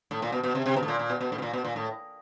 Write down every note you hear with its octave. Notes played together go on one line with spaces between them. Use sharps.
A2
A#2
B2
B2
C3
C3
B2
A2
A#2
A#2
B2
B2
A2
B2
A#2
B2
A#2
A2